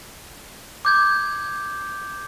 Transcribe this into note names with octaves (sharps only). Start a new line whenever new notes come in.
D6 G6 G#6